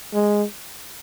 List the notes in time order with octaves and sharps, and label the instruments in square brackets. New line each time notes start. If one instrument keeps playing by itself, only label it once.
[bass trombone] G#3